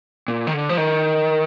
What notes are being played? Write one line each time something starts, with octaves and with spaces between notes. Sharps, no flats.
A#2
D#3
D3
F3
D#3